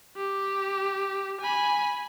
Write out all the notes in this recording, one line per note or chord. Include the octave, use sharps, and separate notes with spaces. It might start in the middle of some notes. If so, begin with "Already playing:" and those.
G4
G#5 B5